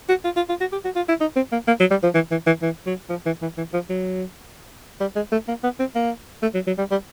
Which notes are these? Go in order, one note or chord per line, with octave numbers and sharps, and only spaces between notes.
F#4
F4
F4
F4
F#4
G4
F#4
F4
E4
D#4
C4
A#3
A#3
F#3
G3
F3
E3
E3
E3
E3
F#3
F3
E3
E3
E3
F3
F#3
G3
G#3
A3
A#3
B3
C4
A#3
A3
F#3
F#3
G3
G3